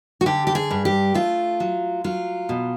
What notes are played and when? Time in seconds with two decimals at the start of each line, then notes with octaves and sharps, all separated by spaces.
0.21 F#4
0.26 D3 G4
0.47 G4
0.55 G#4
0.71 G2
0.85 G4
1.14 A3 F4
1.60 F#3
2.04 F#3 F4
2.49 B2